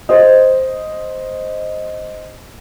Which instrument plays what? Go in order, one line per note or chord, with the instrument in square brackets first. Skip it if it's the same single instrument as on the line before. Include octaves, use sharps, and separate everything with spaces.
[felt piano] C5 D#5